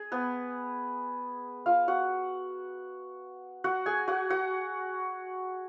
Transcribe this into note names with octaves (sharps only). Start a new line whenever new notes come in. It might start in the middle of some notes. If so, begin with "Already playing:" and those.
Already playing: G#4
B3 B4
F4 F5
F#4 F#5
F#4 F#5
G#4 G#5
F#4 F#5
F#4 F#5